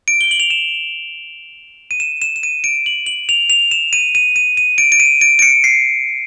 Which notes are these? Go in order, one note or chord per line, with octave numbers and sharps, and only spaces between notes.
D7
G7
F#7
F7
E7
D#7
E7
E7
E7
D#7
D7
F#7
F#7
F7
F7
E7
D#7
D#7
D#7
D#7
D7
D7
D#7
D7
D7
C#7
C7